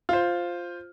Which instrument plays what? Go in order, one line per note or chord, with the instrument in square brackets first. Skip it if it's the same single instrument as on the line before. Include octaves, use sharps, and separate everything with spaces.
[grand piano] F4 C5